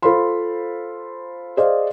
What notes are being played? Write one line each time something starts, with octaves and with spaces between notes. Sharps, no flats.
F4 A4 C5 F5 B5 C6
G#4 C5 D5 D#5 F5